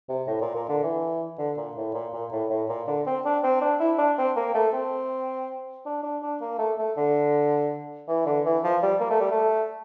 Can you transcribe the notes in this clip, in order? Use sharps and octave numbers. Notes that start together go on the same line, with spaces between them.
C3
A2
A#2
A#2
D3
E3
D3
A#2
A2
A#2
A#2
A2
A2
A#2
D3
C4
D4
C4
D4
E4
D4
C4
A#3
A3
C4
D4
D4
D4
A#3
A3
A3
D3
E3
D3
E3
F3
G3
A#3
A3
G3
A3